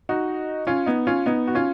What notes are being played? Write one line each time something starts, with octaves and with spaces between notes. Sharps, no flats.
D#4 F#4
C#4 F4
B3 D#4
C#4 F4
B3 D#4
F#4
C#4 F4